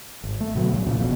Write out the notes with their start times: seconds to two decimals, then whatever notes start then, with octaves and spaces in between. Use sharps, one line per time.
0.24 G#1
0.40 A3
0.55 B2 D3 F#3
0.71 A#1 E2
0.85 A#2 C#3 F3
1.00 F1 F2 B2